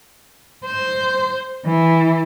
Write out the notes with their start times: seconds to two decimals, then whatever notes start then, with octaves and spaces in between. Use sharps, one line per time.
0.65 C5
1.66 E3